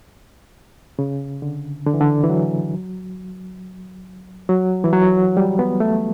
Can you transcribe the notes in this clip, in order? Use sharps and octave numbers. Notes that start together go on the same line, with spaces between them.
C#3
D3
D3
E3
D3
E3
F#3
F#3
E3
F#3
G3
B3
A3